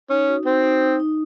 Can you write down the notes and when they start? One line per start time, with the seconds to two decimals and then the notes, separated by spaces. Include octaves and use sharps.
0.10 C#4 D#4
0.28 F#4
0.45 C4 D#4
0.63 D#4
0.82 D#4
1.00 D#4